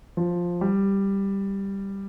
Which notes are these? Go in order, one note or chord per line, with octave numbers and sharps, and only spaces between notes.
F3
G3